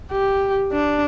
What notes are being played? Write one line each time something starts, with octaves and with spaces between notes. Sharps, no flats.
G4
D4